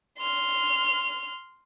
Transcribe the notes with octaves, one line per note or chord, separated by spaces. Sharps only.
C6 F6